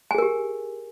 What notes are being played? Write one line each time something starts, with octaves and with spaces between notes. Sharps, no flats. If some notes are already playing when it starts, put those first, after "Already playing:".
G4 G#4 A#4 G#5